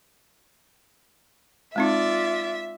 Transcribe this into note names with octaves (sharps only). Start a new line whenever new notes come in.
G#3 C4 D#4 F4 D5 E5